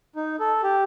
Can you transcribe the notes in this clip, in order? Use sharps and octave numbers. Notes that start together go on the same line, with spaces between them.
D#4
A4
G4